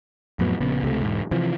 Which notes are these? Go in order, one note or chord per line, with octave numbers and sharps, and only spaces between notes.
F2 A2 F#3 B3
A#1 C#3 B3
C#2 C3 A3
E1 G#2
C3 E3 F3